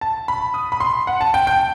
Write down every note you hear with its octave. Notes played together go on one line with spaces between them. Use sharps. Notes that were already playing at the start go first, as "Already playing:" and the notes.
A5
B5
D#6
B5
C6
F#5
A5
G5
G5